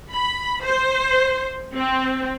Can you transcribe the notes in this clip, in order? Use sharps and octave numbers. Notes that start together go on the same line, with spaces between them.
B5
C5
C4